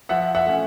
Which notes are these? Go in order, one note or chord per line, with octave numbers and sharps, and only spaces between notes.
F3 E5 F#5
E5 F#5
A3 C#4